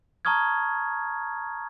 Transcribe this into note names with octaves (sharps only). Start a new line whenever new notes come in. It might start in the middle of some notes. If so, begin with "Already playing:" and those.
A5 A#5 C#6 D#6 F6 G#6